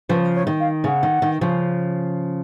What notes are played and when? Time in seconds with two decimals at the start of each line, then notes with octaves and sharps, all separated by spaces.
0.09 C#3 F3 B4
0.34 C#5
0.47 D#3
0.60 F5
0.84 C#3 F#5 G#5
1.03 D#3
1.22 D#3
1.41 C#3 F3